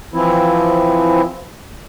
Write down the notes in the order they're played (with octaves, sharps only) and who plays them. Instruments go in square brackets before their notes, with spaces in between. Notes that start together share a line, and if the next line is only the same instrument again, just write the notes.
[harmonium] E3 F3 C4 E4